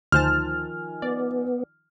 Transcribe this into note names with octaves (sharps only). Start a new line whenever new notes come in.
D2 D#3 F3 C5 G#5 A5 F6
B3 D5